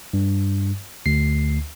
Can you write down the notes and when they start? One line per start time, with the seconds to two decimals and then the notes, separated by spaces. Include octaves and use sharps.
0.13 G2
1.06 D2 C7